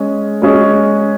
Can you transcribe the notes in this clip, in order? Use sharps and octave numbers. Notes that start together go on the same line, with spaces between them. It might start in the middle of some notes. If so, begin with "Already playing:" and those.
Already playing: G#3 C#4 G#4 D#5
G#3 C#4 G#4 D#5